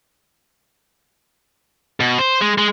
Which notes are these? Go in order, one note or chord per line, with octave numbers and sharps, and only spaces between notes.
B2
C5
G#3
G#3